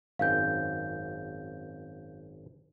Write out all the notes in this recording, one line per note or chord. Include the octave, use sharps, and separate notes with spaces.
G#1 F#2 F5 G5 G6